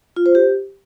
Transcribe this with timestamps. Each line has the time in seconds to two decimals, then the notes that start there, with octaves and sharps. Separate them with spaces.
0.16 F4
0.26 C5
0.35 G4